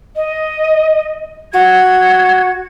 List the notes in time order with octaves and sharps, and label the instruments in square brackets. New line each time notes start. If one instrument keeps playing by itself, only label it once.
[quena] D#5
[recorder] F#4 [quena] G#6